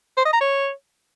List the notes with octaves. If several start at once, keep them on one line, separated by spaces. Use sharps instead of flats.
C5
D#5
A#5
C#5